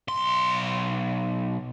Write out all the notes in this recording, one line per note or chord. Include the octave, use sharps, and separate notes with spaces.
B1 C6